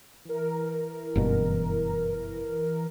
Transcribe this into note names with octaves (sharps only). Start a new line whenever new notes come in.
E3 A#4
F#1 G2 B2